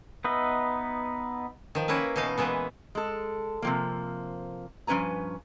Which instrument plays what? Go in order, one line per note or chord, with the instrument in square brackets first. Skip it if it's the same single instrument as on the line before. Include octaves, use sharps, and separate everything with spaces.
[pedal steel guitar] B3 D#4 B4 D#5 E5
[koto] D#3 F3
A#3 C#4 E4 A#4 B4
B2 E3 D#4 F5
A#2 E3 G#3 B3
[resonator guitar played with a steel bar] G#3 A4
C3 F3 A#3
G2 F3 C#4 B4 G#5 A#5